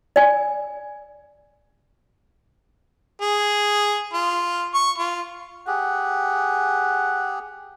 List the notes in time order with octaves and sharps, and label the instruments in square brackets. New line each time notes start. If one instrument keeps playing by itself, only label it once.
[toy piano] D5 G#5
[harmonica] G#4
F4
C#6
F4
[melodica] G4 G#4 [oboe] F#5